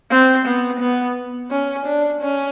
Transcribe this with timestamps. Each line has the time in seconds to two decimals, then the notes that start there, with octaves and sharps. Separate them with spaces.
0.10 C4
0.45 B3
0.80 B3
1.51 C#4
1.86 D4
2.21 C#4